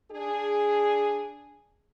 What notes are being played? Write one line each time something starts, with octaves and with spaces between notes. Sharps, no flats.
D4 G#4